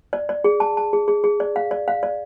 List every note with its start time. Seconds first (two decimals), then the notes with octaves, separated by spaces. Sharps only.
0.13 D5
0.29 D5
0.44 G#4
0.60 A5
0.77 A5
0.93 G#4
1.08 G#4
1.24 G#4
1.40 D5
1.56 F5
1.71 D5
1.88 F5
2.03 D5